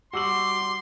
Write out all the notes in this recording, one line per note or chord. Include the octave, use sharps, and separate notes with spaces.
G3 F#4 C6 D6 E6 F#7